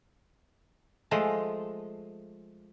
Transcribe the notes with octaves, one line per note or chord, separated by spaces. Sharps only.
F3 G#3 A3